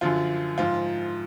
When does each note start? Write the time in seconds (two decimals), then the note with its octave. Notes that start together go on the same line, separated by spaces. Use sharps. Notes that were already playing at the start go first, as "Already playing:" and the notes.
0.01 F#2 D3 F3 F4
0.58 G#2 F3 F4